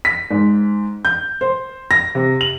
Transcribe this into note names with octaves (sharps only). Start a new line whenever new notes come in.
B6
G#2
G6
C5
A#6
C3
F#7